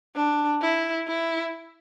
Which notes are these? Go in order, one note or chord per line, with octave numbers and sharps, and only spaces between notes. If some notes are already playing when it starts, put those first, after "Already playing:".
D4
E4
E4